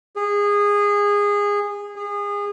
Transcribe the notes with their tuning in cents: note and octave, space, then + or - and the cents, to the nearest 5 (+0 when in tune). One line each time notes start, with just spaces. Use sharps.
G#4 -20
G#4 -30